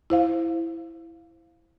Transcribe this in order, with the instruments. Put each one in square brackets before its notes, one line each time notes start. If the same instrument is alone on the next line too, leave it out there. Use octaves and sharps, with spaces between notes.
[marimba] E4 C5 F5